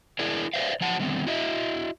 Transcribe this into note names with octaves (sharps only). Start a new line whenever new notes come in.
D4 E4 G#4 A#4 D5
B4 C5 D5 E5 F5
F3 F#3 F#5 A5
D3 D#3 G3 B3 C4
E4 F#4 D#5 E5